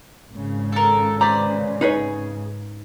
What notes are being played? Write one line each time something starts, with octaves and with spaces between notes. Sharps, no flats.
G#1 C#3
A4 A#4
B4 C5 D5 A#5
D#4 G#4 B4 C#5